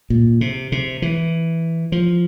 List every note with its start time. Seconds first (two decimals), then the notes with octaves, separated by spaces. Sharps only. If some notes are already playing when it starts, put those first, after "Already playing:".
0.10 A#2
0.41 C3
0.72 C3
1.02 E3
1.92 F3